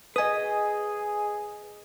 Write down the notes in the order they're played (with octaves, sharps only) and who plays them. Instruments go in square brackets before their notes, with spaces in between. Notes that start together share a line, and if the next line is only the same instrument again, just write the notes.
[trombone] G#4 [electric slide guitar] B4 D#5 [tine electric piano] G#5 D#6